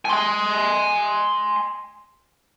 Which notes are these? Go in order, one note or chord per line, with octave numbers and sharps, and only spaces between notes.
G#5 C6